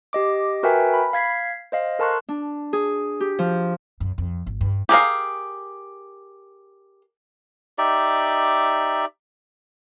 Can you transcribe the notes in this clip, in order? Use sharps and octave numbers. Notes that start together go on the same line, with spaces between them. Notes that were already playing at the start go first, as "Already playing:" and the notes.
G4 D#5 D6
F#4 A#4 B4 E5 G5 G#5
B5
F5 G#6 B6 C7
C5 D#5 F5
A4 A#4 A5 C6 C#6 F#6
D4
G#4
G4
F3
F#2
F2
G#1
G2
G4 G#4 A#4 F5
D#4 G4 D5 E5